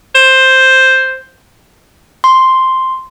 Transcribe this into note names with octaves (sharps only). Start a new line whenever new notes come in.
C5
C6